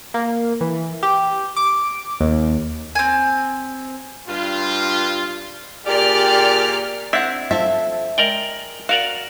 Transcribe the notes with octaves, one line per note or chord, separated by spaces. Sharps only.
A#3
E3
G4
D6
D#2
C4 G#5
G2 F4
A#2 G4 G#4 D5 F6
C4 D4 E4 E5 F#5
F3 A4 E5
G#3 A#4 D5 G5
F#4 A#4 D5 F5